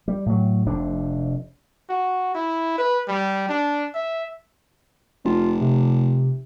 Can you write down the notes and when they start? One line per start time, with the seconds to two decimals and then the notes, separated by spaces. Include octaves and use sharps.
0.08 G3
0.26 A2 F#3
0.66 F1 F2 C3 D4
1.89 F#4
2.35 E4
2.78 B4
3.08 G3
3.49 D4
3.95 E5
5.25 F1 F4
5.61 C3